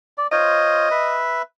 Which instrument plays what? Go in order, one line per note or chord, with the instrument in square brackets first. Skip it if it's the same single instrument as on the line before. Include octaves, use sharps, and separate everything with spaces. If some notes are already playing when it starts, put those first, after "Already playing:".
[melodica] D5
[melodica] F4 C5 C#5 [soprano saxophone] D#5
[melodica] B4 E5